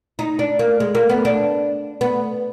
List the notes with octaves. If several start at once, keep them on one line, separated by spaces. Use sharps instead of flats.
D#4
D4
A#3
G#3
A#3
B3
D4
B3